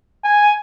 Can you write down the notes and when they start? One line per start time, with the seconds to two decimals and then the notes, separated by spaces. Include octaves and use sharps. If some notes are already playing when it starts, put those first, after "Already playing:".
0.24 G#5